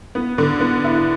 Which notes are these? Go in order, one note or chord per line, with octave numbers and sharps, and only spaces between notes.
B3
D3
B3
E4